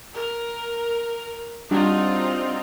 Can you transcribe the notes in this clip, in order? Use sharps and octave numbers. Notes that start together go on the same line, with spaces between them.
A#4
G3 C4 D4 D#4 F4 F#4